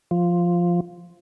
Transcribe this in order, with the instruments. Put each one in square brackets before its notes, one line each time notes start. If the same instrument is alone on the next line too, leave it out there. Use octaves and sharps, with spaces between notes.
[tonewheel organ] F3